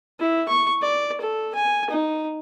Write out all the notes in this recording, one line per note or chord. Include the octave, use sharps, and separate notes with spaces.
E4
C#6
D5
A4
G#5
D#4